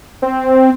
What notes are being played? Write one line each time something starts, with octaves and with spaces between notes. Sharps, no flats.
C4